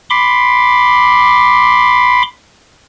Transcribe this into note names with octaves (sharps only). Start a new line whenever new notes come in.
B5 C6 D6